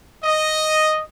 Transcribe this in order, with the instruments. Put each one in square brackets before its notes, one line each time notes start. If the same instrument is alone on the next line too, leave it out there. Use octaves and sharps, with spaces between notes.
[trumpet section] D#5